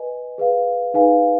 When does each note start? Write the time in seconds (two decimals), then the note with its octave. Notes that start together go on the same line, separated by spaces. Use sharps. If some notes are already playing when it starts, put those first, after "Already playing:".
Already playing: B4 D#5 G#5
0.38 G#4 B4 F5
0.94 D#4 G#4 B4 F5 G#5